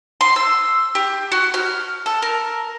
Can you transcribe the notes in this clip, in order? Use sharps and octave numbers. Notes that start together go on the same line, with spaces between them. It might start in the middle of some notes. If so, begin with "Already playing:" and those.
C6
E6
G4
F#4
F6
A4
A#4